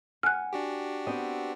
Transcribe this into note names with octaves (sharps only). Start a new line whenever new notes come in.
F#5 G#5 F6 F#6
D4 F#4 G4
B3 C4 D#5